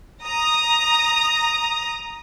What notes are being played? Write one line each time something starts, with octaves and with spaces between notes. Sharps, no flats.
A#5 D#6